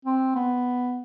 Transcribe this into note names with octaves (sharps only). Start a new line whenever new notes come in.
C4
B3